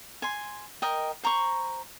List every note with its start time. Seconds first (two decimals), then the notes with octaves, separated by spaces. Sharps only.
0.22 G#5 C6
0.82 A#4 D#5 G5
1.23 C5 A#5 B5 C#6